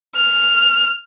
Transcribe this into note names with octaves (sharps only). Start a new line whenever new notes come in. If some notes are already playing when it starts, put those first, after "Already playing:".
F6